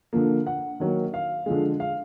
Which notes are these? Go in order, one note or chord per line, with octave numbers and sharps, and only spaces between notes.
D3 F3 A#3
F#5
D#3 F#3 A#3
F5
D3 F3 G#3
F5